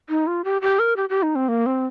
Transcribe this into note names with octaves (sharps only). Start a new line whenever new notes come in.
D#4
F4
G4
G4
A#4
G4
G4
D#4
C4
A#3
C4